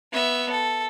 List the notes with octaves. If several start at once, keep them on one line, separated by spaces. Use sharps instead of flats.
B3 E5
A4